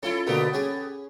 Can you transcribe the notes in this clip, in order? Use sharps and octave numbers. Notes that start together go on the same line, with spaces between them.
C#4 E4 F4 A4
B2 D3 A#3 B3 G4 A4
C#4 G#4